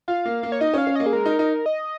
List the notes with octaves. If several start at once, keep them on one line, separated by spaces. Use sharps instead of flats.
F4 F5
A#3
A#3
C#5
D#4 D#5
C#4 F5
C#4
A#3 D#5
G#4
G#3 A#4
D#4
D#4
D#5